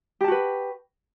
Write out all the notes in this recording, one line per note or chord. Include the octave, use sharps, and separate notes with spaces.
F#4 G4 B4 A5